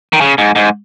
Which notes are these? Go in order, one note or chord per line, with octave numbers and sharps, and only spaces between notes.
D#3
C#3
G#2
G#2